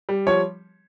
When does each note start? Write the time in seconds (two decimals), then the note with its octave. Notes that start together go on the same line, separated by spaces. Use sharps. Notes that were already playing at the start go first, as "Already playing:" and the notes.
0.09 G3
0.27 F3 C#5